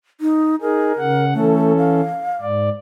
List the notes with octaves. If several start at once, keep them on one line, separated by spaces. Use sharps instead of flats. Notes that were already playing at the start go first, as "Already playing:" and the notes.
D#4
D#4 G#4 A#4
C#3 F#5
E3 A3 C#4 A4
F5
G#2 D5